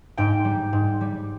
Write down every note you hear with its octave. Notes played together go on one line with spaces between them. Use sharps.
G#2 G5
G3
G#2
G3